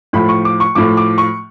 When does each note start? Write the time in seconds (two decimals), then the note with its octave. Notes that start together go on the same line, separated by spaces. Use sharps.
0.13 A2 F3 B5
0.29 C#6
0.45 D6
0.60 C#6
0.75 A2 F3 D6
0.97 D6
1.18 C#6